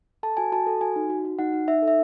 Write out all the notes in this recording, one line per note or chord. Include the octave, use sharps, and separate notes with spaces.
A4 A5
F#4 G#5
F#4 A5
A4
F#4 G#5
D#4
F#4
F#4
D#4 F#5
D#4
D#4 E5
A4
E5